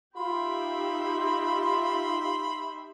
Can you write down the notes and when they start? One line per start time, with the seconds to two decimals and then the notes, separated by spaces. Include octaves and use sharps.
0.16 D#4 F4 G4 E5 B5 C6